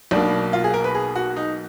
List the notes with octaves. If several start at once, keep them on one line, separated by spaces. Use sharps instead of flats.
B1 B2 A#3 D4
F4
G#4
A#4
B4
G#4
F#4
D#4